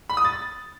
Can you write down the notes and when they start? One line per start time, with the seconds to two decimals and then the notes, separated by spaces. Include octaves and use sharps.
0.10 B5
0.17 D#6
0.25 A6